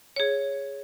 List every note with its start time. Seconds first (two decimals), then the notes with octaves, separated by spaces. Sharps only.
0.16 G#4 C#5